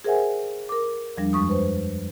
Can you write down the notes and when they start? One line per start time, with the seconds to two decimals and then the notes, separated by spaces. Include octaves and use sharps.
0.04 G#4 A#4 C5 E5 F#5 G#5
0.69 A#4 D6
1.17 E2 F3 G3 D4
1.33 F#2 G#3 C#6 D#6
1.49 B4 C5